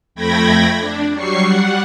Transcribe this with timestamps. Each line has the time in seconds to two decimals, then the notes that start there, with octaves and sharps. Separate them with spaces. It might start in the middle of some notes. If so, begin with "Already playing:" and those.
0.15 F2 A3 G5 B5 G#6 A#6
0.78 D4
1.13 F#3 G3 C#6 C7
1.47 G3 F#5